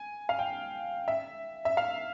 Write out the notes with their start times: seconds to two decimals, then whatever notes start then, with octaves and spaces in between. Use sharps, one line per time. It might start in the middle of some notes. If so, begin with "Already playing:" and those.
Already playing: G#5
0.29 F5
0.39 G5
1.08 E5
1.65 E5
1.77 F5